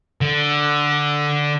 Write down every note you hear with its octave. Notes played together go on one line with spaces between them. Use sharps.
D3